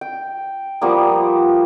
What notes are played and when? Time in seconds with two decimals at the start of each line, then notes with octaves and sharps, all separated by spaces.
0.01 G5
0.81 F3 G3 A#3 B3